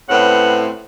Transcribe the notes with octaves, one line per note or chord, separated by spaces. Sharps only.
A2 C4 C#4 B4 F#5